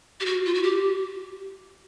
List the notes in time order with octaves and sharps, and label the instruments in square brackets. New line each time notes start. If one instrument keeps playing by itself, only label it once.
[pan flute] G4
F#4
F4
F#4
G4